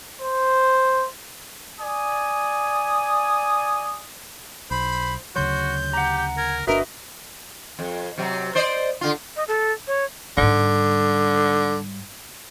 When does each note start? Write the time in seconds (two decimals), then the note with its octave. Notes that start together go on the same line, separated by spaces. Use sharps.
0.21 C5
1.81 D5 G#5 D#6
4.71 B1 C5 B5
5.36 D2 C#3 F#3 F#4 C#5 C6 G6
5.93 G4 F#5 A#5
6.37 A#4 G#6
6.67 G1 D4 F#4 A#4 B4 D#5 E5
7.79 F2
8.18 C3 F#3
8.55 C5 D5 D#5
9.01 D3 F4
9.36 D#5
9.48 A4
9.87 C#5
10.37 G#2 D3 G3